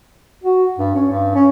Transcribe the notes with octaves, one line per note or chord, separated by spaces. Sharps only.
F#4
G2
C#4
G2
C#4